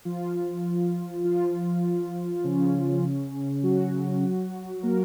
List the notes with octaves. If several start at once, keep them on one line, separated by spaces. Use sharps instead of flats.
F3 F4
F3 F4
C#3 C#4
F#3 F#4
A#3 A#4